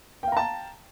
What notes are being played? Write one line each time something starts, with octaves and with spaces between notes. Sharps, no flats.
F5 G5 A5 A#5